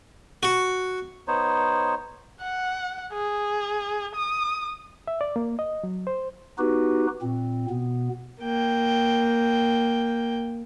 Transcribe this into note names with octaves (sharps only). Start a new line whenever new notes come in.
F#4
B3 D#4 C5 C#5
F#5
G#4
D#6
E5
D5
A#3
D#5
F#3
C5
B3 D#4 F#4 G4 B4
A#2 C4
B2 B3
A#3 G5